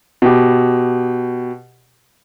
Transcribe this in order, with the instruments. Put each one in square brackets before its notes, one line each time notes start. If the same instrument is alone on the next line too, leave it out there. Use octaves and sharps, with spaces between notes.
[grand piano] B2 G4